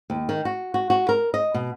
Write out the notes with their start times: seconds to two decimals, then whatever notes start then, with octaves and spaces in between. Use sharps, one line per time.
0.10 D#2
0.29 D#3
0.45 F#4
0.74 F#4
0.90 F#4
1.09 A#4
1.34 D#5
1.54 B2